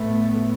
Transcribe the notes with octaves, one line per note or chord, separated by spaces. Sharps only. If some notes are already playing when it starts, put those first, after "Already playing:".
Already playing: A2 A3 B3